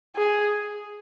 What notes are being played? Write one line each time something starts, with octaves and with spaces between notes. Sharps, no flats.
G#4